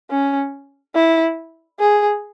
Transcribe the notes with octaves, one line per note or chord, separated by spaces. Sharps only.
C#4
E4
G#4